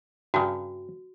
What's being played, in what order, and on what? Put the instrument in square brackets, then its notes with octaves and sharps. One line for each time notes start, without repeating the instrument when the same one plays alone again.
[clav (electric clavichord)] G2 C#3 [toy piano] F#4